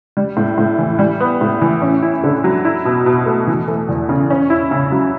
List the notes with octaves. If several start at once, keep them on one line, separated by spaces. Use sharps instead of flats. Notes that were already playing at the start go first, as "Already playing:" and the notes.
G3
A2
A2
E3
G3
B3
A2
E3
C#4
E4
D3
F#3
E4
B2
B2
A3
E3
A3
E2
C#3
C#4
E4
C#3
F#3